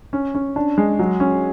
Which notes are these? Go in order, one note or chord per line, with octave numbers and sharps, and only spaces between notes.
C#4
C#4
D4
G#3
F#3
C#4